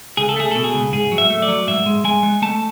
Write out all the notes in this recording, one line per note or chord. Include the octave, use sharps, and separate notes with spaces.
C#2 G#4
A4
A3 G#4
B2 A4
G#4
C#2
G#2 G#4
F#3
E5
A3
D5
F#3
G#2 E5
G#3
G#3 G#5
G#3
A3 A5